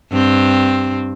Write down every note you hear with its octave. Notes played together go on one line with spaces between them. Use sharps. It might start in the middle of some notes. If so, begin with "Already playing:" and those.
G2 C4